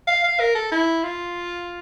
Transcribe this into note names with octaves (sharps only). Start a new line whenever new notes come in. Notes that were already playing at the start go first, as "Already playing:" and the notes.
F5
F5
A#4
A4
E4
F4